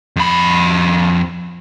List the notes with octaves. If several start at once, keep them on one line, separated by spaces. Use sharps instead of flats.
F2 B5